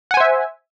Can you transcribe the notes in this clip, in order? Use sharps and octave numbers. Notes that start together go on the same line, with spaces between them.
C5 E5 F#5 G#5